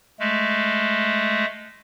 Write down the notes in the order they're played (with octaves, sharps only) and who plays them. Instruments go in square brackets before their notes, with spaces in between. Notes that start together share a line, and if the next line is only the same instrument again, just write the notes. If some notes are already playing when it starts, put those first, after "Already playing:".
[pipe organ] G#3 A3